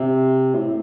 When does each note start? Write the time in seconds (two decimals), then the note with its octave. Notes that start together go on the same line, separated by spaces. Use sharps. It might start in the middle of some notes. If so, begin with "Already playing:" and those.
Already playing: C3
0.55 A2